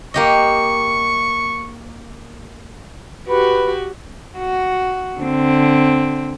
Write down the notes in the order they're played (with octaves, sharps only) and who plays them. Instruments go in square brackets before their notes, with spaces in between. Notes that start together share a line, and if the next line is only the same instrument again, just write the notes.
[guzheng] A#3 G4 D#5 [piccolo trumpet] C#6
[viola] F#4 G4 [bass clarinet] B4
[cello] F#4
D3 C4